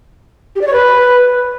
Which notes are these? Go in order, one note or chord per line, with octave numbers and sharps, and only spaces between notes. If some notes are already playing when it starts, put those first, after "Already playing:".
G4
D5
C#5
B4